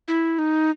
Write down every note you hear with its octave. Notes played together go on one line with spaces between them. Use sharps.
E4
D#4